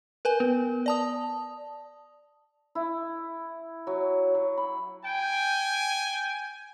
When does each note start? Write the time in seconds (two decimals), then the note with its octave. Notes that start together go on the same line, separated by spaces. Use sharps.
0.25 A#4 B4 G#5
0.40 B3
0.86 D5 A5 D#6
2.75 E4
3.87 F#3
4.35 F#3
4.57 B5
5.05 G5 G#5